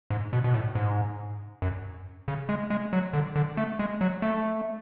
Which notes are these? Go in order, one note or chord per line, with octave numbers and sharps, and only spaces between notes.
G#2
B2
B2
A2
G#2
F#2
C#3
G#3
G#3
F#3
D3
D3
A3
G#3
F#3
A3